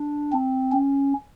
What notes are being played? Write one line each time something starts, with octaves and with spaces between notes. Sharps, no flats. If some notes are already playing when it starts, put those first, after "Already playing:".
Already playing: D4
C4
C#4